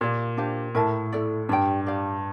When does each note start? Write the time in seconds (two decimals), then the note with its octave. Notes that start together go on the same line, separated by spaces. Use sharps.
0.01 A#2 G4 D5 F5
0.37 D4 G4 C5 F5
0.75 A2 A#4 E5 A5
1.12 E4 A4 D5
1.49 G2 G4 D5 G5
1.86 G4 D5 F5